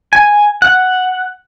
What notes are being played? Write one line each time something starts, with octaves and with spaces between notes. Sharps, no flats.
G#5
F#5